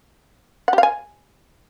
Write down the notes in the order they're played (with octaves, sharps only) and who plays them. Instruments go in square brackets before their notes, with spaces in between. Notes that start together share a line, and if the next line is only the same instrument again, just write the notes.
[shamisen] F#5
G4
F5
G#5